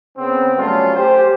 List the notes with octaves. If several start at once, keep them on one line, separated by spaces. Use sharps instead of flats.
C#3 B3 C4
F#3 G3 A3 C#4 F4
G4 C5